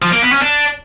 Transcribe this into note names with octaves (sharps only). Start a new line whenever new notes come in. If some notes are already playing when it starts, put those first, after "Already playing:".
F3
A#3
B3
C#4
D4